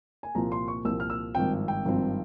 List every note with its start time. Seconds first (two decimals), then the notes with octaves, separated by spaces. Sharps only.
0.23 G#5
0.35 C2 A#2 F3 A#5
0.52 C6
0.68 C#6
0.85 C2 A#2 F3 E6
1.00 F6
1.10 E6
1.35 G#1 G2 F3 C4 G5
1.68 G5
1.85 G#1 G2 F3 C4